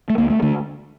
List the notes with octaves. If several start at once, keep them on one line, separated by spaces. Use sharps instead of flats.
A3
D2 A#3
A3
D3 A3